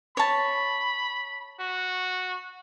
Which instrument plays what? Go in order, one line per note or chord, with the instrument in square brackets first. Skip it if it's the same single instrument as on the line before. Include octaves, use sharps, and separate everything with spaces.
[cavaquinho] C#5 A5 [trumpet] B5
[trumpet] F#4